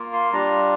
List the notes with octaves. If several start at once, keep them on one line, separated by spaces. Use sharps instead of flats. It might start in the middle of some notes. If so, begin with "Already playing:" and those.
Already playing: A#3 F4
C6
G3 D4 F4 A#5